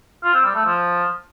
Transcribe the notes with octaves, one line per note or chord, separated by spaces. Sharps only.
F4
C4
G3
A3
F3